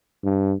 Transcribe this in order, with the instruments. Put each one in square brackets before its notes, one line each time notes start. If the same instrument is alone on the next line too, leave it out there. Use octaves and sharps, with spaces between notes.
[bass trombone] G2